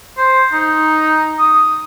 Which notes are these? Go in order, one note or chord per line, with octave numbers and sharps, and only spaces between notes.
C5
D#4
D#6